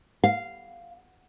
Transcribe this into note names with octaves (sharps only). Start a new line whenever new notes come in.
F5